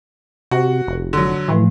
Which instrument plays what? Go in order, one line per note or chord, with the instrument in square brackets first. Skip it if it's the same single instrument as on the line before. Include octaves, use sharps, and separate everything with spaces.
[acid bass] C3 [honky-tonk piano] F#4
[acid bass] F1
[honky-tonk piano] D3 F#3
[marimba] A2 F3 A3 [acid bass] E3